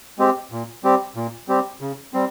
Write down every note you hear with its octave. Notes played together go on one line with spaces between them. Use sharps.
G#3 C4 G4
A#2
G3 C4 G4
A#2
G3 C4 G4
C#3
G3 C4